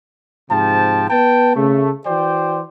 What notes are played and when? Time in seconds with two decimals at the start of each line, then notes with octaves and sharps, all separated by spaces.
0.50 G#2 C3 F3 G5 A5
1.10 B3 B4 G5 A5
1.56 C#3 A3
2.06 E3 F#4 C5 D5 G5